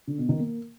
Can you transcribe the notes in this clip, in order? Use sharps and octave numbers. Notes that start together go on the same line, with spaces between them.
D3
B2
D#3
A#3